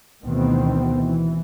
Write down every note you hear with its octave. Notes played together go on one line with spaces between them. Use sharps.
D2 B2 D#3 E3 B3 C4
E3